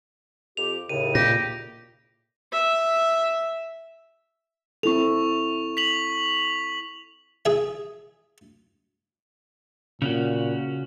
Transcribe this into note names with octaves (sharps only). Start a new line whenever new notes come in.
F2 G4 F7
D#2 A2 C#3 D#7
A#2 G4 A#6
E5
C4 E4 A4 C#6 F7
B6 F7 F#7
G#4 E5
A#2 C#3 C#4 F#4